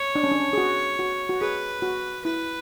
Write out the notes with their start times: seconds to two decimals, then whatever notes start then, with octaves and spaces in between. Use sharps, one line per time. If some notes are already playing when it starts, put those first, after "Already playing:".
Already playing: C#5
0.15 D4
0.24 C#4
0.31 D4
0.53 G#4
0.58 F#4
0.99 F#4
1.29 F#4
1.41 G#4 B4
1.82 F#4
2.25 E4 B4